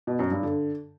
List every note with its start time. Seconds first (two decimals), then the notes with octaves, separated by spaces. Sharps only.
0.07 B2
0.19 F#2
0.31 G2
0.43 D3